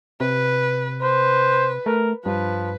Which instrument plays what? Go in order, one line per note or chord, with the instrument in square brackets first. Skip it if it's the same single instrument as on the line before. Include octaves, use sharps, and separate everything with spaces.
[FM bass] C3 [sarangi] B4
[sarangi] B4 [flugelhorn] C5
[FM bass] A3 [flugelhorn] A#4
[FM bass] G2 [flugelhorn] F3 [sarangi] B4